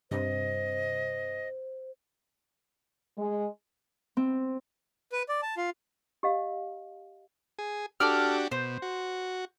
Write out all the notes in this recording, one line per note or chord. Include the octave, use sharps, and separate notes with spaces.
G2 C3 C5 D#5
G#3
C4
B4
D5
A5
F4
G4 D#5 F5
G#4
D4 F#4 G4 A4 D5 F6
B2 C5
F#4